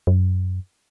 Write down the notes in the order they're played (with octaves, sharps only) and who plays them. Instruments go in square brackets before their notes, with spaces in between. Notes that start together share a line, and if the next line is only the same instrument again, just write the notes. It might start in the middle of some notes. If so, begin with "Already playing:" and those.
[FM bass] F#2